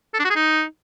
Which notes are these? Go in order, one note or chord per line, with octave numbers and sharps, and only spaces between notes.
A4
D4
F#4
G#4
D#4